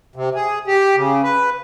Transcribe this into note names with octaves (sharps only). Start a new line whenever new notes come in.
C3
G#4
G4
C#3
B4